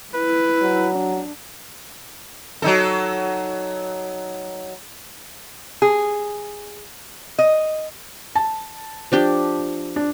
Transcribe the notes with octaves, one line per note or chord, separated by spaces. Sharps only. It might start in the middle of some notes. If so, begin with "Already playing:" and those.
E4 B4
F#3
D4
F#3 D#4 A4
G#4
D#5
A5
F3 D4 G4
D4